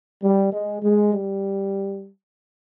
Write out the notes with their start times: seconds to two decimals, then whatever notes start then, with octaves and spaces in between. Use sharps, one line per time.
0.23 G3
0.52 G#3
0.83 G#3
1.13 G3